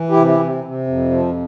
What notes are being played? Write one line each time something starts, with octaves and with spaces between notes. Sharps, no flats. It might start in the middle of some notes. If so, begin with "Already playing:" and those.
Already playing: E3
E4 G4
C3
E4 G4
C3
C3
F2
F3